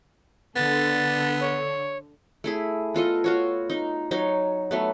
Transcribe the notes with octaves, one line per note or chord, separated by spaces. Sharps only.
D3 B3 A4 A6
C#5
A3 E4 G#4
B3 F4 A4 D#5
F4 F#4 C#5
D#4
F#3 D#4 C#5
F#3 A3 B3